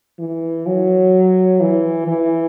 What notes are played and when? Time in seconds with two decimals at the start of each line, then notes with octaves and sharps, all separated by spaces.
0.19 E3
0.66 F#3
1.60 E3
2.07 E3